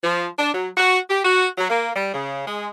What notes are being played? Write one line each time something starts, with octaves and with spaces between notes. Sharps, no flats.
F3
D4
F#3
F#4
G4
F#4
F#3
A#3
G3
C#3
G#3